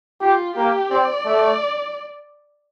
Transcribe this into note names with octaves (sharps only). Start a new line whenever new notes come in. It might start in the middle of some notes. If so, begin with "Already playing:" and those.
F4 G4
A#3 G4
C4 D5
A3